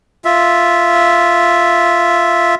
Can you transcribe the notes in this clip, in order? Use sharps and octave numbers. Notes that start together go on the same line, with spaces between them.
F4 E5